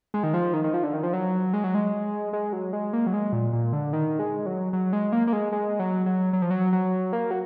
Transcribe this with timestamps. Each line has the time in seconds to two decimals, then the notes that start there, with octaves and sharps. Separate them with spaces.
0.14 G#3
0.23 D#3
0.34 F3
0.54 D#3
0.64 D#3
0.74 F3
0.83 D3
0.94 D#3
1.03 F3
1.13 F#3
1.53 G#3
1.64 F#3
1.75 G#3
2.33 G#3
2.53 F#3
2.73 G#3
2.93 A#3
3.07 F#3
3.13 G#3
3.33 A#2
3.53 A#2
3.73 D3
3.93 D#3
4.19 G#3
4.46 F#3
4.73 F#3
4.93 G#3
5.12 A#3
5.27 A#3
5.33 G#3
5.52 G#3
5.79 F#3
6.06 F#3
6.33 F#3
6.42 F3
6.51 F#3
6.73 F#3
7.13 A#3
7.31 F#3